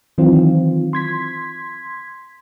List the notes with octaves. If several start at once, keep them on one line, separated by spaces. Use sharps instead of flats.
D#3 E3 F#3 C4 F4
C6 G#6 B6